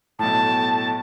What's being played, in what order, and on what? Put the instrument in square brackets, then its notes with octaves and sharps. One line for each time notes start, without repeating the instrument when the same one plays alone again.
[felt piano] B1 A2 [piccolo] A5